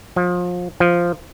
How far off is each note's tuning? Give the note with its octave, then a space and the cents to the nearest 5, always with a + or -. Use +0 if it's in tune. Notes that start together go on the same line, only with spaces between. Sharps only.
F3 +30
F3 -5